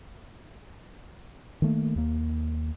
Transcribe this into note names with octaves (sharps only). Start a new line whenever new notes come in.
D#3 A3 A#3
D#2 A#3